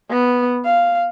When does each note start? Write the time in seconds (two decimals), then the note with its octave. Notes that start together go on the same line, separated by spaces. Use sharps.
0.10 B3
0.65 F5